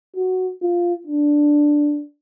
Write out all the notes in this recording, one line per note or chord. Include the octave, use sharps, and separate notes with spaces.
F#4
F4
D4